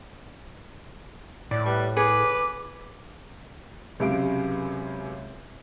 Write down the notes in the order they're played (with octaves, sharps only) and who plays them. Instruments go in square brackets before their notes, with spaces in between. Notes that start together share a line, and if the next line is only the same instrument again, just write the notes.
[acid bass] A2 [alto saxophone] D5
[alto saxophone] G3 [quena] B4
[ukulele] G#4 [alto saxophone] B4 [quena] D6
[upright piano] C#2 F#2 C3 F5 D7